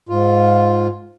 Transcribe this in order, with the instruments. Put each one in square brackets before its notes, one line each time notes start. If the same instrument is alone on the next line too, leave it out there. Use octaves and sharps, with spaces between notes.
[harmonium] G#2 F4